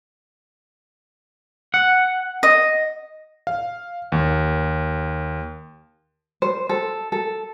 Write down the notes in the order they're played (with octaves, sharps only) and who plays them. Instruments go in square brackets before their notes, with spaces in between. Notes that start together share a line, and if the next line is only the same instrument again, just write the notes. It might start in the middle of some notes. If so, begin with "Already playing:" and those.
[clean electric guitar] F#5
[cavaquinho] D#5
[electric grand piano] F5
D#2
[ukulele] C5
A4
A4